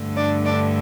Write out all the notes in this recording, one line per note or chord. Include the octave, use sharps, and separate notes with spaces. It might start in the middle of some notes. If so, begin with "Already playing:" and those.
Already playing: G2 D3 A3
D4 D5
D4 D5